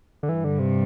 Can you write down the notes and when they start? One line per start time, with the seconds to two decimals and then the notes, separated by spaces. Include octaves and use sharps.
0.23 D3
0.29 G2 E3
0.44 D3
0.59 C3